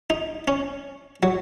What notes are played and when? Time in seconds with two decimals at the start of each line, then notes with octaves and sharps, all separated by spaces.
0.10 D#4
0.48 C#4
1.23 F#3